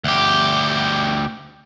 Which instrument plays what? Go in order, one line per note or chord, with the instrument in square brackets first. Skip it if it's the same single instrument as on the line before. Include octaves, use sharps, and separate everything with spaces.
[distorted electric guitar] D2 G4